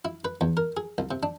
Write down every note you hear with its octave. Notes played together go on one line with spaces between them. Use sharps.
E4
B4
E2
A#4
G#4
C2
C3
D4